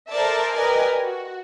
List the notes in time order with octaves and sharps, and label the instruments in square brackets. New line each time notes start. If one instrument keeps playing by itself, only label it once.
[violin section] A4 A#4 C5 D5 E5 A5
G4 A#4 B4 D5 D#5 G#5
F#4